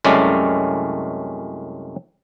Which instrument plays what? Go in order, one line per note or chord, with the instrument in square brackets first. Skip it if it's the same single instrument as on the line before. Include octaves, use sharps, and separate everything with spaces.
[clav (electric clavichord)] C2 F#2 G#3 A3 C#4 D5